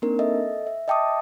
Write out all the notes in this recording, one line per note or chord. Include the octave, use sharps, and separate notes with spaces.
A#3 C4 D4 D#4 A#4
A4 D#5 E5
E5
D#5 E5 G5 A5 D6 D#6